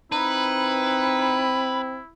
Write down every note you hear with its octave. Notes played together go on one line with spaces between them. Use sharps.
C4 D#4 E4 B4